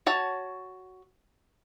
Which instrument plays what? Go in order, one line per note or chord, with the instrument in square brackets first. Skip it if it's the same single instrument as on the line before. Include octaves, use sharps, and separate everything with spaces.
[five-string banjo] F#4 C#5 A5